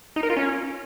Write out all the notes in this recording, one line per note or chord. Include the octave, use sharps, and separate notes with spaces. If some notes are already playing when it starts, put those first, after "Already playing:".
D#4
A#4
F4
C#4